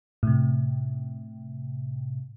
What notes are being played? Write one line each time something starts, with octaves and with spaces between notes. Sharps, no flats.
A2 C3